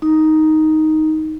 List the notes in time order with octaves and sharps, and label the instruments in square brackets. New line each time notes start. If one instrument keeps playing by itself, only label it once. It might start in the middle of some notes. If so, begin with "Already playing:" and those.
[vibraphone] D#4